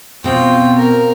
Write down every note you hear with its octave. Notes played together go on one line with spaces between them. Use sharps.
B2 C4 F4 G5
A#4